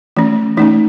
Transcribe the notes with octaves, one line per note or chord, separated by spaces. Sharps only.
E3 A3 C#4
E3 A3 C#4 D#4